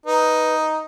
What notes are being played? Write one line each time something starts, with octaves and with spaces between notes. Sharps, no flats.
D#4 B4